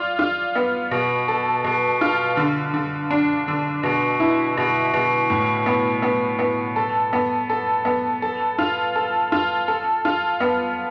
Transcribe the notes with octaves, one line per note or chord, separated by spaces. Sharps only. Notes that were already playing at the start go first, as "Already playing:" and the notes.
Already playing: F4 D5
F4
B3
B2
A4
B2
F4
D3
D3
D4
D3
B2
E4
B2
B2
A2
B3
B3
B3
A4
B3
A4
B3
A4
F4
A4
F4
A4
F4
B3